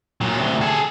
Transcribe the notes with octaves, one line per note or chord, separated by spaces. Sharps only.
A#2 F#3
D2 C3
G#4 A4